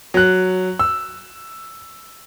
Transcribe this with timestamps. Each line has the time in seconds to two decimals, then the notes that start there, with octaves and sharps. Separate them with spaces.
0.14 F#3 F#6
0.79 E6